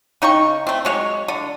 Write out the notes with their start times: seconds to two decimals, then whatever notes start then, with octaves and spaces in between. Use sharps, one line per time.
0.22 C#3 D#4 G5 C#6
0.67 A3 C4
0.85 F#3 G#3 C#5
1.28 D3